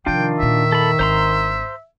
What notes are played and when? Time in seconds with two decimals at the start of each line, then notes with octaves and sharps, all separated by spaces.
0.06 C3 D#3 F3 D4 F4 G5
0.39 E2 A#2 E5
0.72 A4 B5
0.99 G#1 D4 C5 A#5 C6